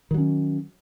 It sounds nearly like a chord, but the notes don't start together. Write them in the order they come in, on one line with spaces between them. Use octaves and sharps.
D#3 F#3 C#4